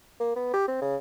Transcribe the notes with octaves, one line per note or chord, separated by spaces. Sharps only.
A#3
B3
G4
C4
C#3